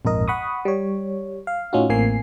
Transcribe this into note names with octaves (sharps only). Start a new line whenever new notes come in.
A#1 F2 G#2 A#4 D#5
F#5 B5 C#6 D#6
G3 C#5
F5
A2 C#4 D#4 F4 F#4
A1 A2 A#3 C4 G#5 C7